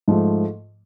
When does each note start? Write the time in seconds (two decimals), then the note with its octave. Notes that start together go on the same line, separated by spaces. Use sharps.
0.08 G#2 F3 A3